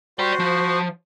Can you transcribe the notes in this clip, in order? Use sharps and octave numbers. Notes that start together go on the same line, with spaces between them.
F#4 C5 D5 G5
F3